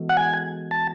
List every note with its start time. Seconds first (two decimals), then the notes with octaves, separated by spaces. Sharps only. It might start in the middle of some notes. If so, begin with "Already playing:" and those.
Already playing: E3 G#3 B3 F#4 A4
0.09 F#5
0.17 G#5
0.71 A5